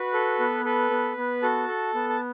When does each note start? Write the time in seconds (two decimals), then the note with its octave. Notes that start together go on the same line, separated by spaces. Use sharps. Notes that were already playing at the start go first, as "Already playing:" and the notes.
Already playing: F#4 B4 B5
0.14 A4
0.40 B3
0.65 A4 B4 B5
0.90 B3
1.17 B3
1.42 F#4 A4 A5
1.68 A4
1.95 B3
2.09 A5